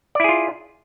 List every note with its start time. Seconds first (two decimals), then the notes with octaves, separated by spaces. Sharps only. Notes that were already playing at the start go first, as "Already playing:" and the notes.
0.15 D5
0.20 E4
0.24 G#4
0.29 F4